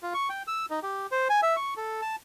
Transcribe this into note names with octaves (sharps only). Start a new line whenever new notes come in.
F4
C#6
G5
E6
D#4
G4
C5
G#5
E5
C#6
A4
A5